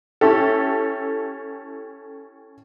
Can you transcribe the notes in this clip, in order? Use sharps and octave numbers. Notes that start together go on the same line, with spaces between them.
C#4 E4 G4 A4